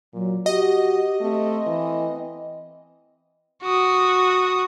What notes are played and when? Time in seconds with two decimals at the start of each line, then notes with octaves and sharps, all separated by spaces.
0.14 A#2 F#3
0.46 F#4 G4 D#5
1.21 A3 C4
1.67 E3
3.63 F#4 D#6